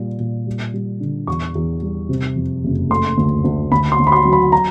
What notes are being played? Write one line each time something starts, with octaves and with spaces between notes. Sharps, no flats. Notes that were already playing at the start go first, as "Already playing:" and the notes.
Already playing: A#2 G3
A#2
G3
G3
D3
E2 C#6
E2
G3
C3
F2
F#1
A3 C6
D2
D2
D2 B5
C6
D2
B5
C6
F#3
B5
A#5